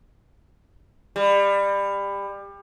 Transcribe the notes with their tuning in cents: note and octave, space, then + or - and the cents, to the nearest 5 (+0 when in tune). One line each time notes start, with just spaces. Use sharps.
G3 +25